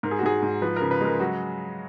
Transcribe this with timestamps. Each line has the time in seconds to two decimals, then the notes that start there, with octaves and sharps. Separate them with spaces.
0.03 G#2 A#4
0.11 G#4
0.19 F#4
0.23 G#2 G#4
0.42 G#2
0.62 F3 B4
0.76 C#3 A#4
0.91 B4
1.01 G#3 A#4
1.20 F#3 F#4